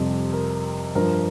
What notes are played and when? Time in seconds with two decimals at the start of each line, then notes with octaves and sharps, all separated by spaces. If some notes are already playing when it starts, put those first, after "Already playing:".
Already playing: F2 C3 G3 G4
0.33 A#4
0.95 G2 F3 A#4